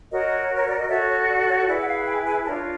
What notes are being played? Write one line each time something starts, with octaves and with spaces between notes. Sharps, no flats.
F#4 A#4 C#5 D#5
C#5
D5
D#5
F#4 A4 C#5 E5
C#5
D5
C#5
E4 G#4 B4 D5
F#5
F5
G5
G#5
D4 F4 A#4 C#5 A5